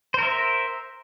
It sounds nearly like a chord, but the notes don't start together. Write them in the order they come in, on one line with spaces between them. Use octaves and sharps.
C5 A#4 E5